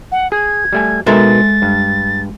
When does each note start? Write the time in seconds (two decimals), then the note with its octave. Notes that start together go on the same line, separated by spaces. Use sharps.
0.12 F#5
0.32 G#4 G#6
0.73 G3 A3 G#5
1.06 B2 G#3 D#4 A4 A#4 E5 A6
1.62 G2